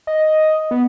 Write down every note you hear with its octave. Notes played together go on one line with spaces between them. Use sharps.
D#5
B3